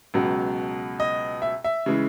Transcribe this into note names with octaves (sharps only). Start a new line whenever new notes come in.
C#2 B2 F#3
D#5
E5
E5
C#3 E3 G#3